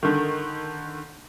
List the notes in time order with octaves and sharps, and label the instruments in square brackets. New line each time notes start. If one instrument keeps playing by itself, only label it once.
[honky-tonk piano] D3 D#3